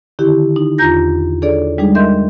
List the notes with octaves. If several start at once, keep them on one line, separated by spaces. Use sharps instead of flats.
D3 D#3 E4 G4
D#4
E2 D4 F4 A#5 G6 A#6
D4 G#4 A4 C#5 D5
G3 G#3 D4 D#4 G#4
A#4 D#5 E5 C6 G6